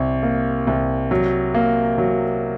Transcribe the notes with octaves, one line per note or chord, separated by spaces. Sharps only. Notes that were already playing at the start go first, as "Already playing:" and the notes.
Already playing: C2
A#3
C2
F#3
A#3
F#3